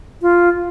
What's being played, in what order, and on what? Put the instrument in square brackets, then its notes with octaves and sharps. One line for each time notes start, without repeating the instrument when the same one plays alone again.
[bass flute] F4